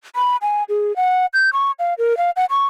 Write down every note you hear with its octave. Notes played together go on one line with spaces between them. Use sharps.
B5
G#5
G#4
F#5
G6
C#6
F5
A#4
F5
F#5
C#6